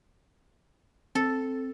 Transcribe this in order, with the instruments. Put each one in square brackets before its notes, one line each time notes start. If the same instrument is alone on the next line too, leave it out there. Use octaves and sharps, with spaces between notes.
[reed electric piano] C4 [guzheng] A4